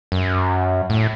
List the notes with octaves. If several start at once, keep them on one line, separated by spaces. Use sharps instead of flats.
F#2
A2